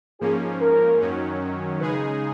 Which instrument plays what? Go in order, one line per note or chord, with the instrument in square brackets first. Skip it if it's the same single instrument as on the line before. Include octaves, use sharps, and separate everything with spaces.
[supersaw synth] G#2 F3 A#3 C#4 [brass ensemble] G#4
[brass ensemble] A#4
[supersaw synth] F#2 D#3 F#3 C#4
[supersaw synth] C#3 G#3 D#4 G#4 [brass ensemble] B4